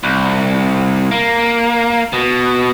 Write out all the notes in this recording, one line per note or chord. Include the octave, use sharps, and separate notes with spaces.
C2
A#3
B2